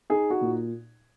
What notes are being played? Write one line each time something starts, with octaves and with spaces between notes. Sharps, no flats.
D#4 G#4
F#4
A#2